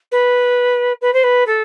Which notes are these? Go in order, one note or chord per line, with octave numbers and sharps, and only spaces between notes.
B4
B4
C5
B4
A4